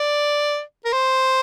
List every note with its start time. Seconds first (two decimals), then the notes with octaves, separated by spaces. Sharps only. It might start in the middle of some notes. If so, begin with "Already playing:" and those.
Already playing: D5
0.85 A#4
0.93 C5